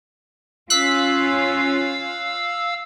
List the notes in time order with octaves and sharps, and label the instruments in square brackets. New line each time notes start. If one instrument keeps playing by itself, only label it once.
[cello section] C#4 F4 [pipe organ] F5 E6 [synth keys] F#6 B6